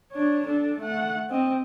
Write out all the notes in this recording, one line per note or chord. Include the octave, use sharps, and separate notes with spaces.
D4 C#5
D4 A4
A3 F#5
C4 D#5